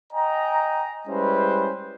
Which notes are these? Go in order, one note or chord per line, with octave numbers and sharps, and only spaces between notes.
D#5 G5 G#5 A#5
G3 G#3 C#4 E4 B4 C5